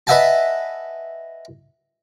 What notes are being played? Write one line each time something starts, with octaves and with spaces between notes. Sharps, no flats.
B4 D#5 E5 F#5 G#5 A5